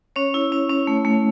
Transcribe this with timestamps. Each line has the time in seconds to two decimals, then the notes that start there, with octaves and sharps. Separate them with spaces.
0.16 C#4 C#5
0.34 E4
0.52 C#4
0.70 C#4
0.87 A3
1.05 A3